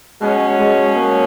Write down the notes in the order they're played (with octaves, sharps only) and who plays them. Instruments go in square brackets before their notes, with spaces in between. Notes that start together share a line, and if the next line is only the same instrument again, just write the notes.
[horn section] B2 F#3 C#4 [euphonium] G#3
[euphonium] G#3
A#3